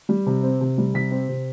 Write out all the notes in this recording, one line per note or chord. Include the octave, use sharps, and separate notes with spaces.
G3
C3
C4
C3
G3
C3 B6
C4
C3